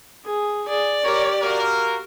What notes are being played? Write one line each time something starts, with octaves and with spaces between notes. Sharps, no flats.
G#4
G#4 D5
G4 A#4 C#5
A#3 F#4 A#4